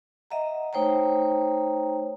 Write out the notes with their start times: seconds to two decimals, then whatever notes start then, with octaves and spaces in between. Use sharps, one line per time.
0.31 D#5 E5 F#5 A#5
0.73 A3 D#4 C5 C#5 G5 A#5